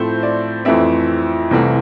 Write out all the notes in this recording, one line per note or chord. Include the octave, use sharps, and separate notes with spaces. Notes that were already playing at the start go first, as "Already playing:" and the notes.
Already playing: A2 F3 A3 C4 C5
D5
F2 E3 A3 C4 E5
C2 C3 E3 A3 C4